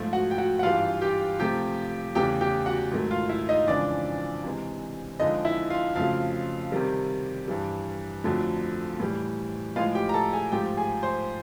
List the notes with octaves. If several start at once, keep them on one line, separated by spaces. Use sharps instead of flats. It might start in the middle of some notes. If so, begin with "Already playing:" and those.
Already playing: G#2 F3 A3
F#4 F#5
G5
F#4 F#5
F#5
G2 E3 G3 F4 F5
G4 G5
C3 F3 A3 G4 G5
E2 C#3 E3 A3 G4 G5
G4 G5
F#4 F#5
G#2 D#3 F#3 A3
F4 F5
E4 E5
D#4 D#5
F2 C#3 E3 G#3 D4 D5
C3 E3 G#3
F2 D3 F3 G#3 D#4 D#5
E4 E5
F4 F5
F2 C#3 F#3 A3 F4 F5
C3 D#3 G3
G2 E3 G3
F2 D3 F#3 A3
A2 E3 G3
A2 F3 G#3 F4 F5
G4 G5
A#5
A4 A5
G#4 G#5
G#2 F3 A3 G4 G5
G#4 G#5
C5 C6